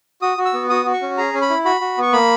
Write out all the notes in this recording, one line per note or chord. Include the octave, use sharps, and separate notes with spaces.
F#4 D#6
F#4
E6
B3
F#4 D#6
F#4
C#6
C#4
G#4 A#5
C#4
B5
E4
F#4 B5
F#4
B3 C#6
A#3 B5